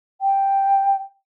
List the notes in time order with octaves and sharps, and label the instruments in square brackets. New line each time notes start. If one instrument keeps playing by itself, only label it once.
[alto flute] G5